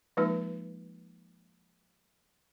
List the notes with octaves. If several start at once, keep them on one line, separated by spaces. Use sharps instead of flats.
F3 G#3 A#3 D#4 F4 B4